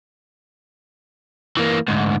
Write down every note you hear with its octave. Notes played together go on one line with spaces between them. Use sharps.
E3 A#3
D2 G#2